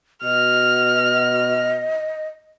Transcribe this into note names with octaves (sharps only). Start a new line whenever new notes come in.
B2 F#4 D#5 F6